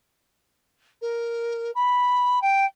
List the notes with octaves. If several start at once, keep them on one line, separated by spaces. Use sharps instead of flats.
A#4
B5
G5